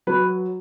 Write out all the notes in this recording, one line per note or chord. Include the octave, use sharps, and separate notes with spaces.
F#3 B4